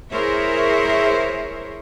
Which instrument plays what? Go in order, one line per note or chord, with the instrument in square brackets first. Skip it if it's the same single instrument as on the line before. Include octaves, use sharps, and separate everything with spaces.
[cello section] E4 G#4 A#4 C5 C#5 E5